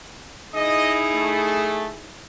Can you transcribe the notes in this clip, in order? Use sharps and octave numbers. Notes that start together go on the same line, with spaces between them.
D#4 E4 G#4 D#5
A3